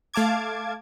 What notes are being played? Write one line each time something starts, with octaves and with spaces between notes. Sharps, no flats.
A3 F5 A5 D6 G#6